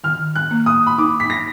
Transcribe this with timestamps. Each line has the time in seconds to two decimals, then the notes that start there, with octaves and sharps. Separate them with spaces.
0.04 D#3 F6
0.35 F#6
0.51 A#3
0.66 D#6
0.87 B5
0.98 D#4 D6
1.20 B6
1.30 A#6